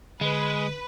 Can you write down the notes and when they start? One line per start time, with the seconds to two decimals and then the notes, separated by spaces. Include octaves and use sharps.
0.21 D3 G#3 B4